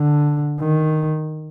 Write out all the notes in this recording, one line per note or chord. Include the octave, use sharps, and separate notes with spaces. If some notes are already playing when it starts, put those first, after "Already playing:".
Already playing: D3
D#3